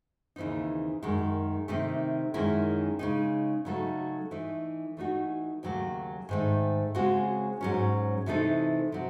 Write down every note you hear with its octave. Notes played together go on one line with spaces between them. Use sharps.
D#2 C#3 E3 C4 D#4
F#2 D#3 G#3
C3 D#3 A3 D#4
F#2 D#3 G#3 C#4 E4
C#3 G#3 D#4
C#3 F#3 A3 D#4 A4
E3 A3 D#4
E3 A3 D#4 F#4
D#2 C#3 F#3 A3
G#2 D#3 A3
C#3 G#3 C4 F#4
G#2 F#3 C#4
C3 E3 A3 D#4 A4
C3 F#3